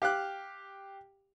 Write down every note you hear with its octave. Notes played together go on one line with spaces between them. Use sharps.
G4 F5 D6 F#6